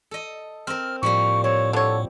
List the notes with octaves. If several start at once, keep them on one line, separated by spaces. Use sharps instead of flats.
A4 D#5
C4 A#4 F6
A2 F3 G3 A#3 C#6
C4 C#5
D3 A4 C#5